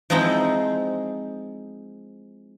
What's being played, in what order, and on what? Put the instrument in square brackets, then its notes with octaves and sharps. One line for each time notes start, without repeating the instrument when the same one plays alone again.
[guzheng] F3 G#3 C4 D#4 E4 C5